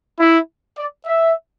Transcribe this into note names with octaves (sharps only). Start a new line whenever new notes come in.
E4
D5
E5